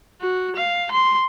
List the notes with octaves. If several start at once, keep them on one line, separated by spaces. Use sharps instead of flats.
F#4
F5
C6